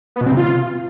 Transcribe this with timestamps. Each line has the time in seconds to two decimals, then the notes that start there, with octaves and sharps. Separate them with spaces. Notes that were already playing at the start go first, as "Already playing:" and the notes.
0.16 B3
0.21 B2
0.26 C4
0.32 C3
0.37 F4